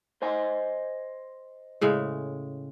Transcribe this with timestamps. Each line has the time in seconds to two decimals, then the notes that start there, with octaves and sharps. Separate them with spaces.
0.22 C5 D#5 G#5
1.81 A2 C#3 G#3